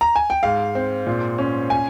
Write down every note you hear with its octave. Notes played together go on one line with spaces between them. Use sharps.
A#5
G#5
G5
G#2 F5
C4
A#2
C#4
G#5